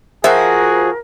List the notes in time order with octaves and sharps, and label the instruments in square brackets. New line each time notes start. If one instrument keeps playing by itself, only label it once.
[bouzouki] F3 F#4 [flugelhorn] G#4 [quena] A#4 [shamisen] E5